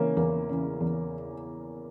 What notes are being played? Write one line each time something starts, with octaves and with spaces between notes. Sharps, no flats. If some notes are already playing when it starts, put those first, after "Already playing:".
Already playing: C#3 E3 A#3 C#4
E2 A#3
C#3 E3
E2